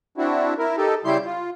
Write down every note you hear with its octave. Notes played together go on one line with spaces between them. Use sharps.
C4 D4 E4 F#4
E4 A#4
D#4 G4 A4
C#3 G3 E4 G4 C6 G6
F4